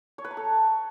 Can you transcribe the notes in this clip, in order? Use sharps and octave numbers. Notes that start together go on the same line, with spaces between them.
C#5
B4
A#5
A4